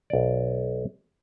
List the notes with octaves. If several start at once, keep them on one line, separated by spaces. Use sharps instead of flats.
B1 D5